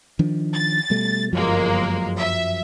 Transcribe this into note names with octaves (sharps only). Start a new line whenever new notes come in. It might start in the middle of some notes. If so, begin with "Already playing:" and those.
D#3 F3 D4
A6
B2 G3 A3
G1 F#2 F3 F#3 G#3 A#3
E5